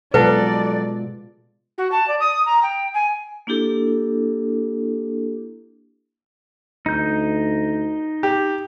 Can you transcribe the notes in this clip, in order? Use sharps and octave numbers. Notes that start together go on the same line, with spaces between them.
B2 F#3 G#3 F4 A4 B4 D5
F#4
A5
D5
D#6
A#5
G5
G#5
A#3 D4 E4 G4 A4
D2 D#4 G6
G4